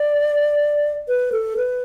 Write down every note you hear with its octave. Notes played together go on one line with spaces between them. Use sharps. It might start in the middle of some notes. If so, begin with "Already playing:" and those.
Already playing: D5
B4
A4
B4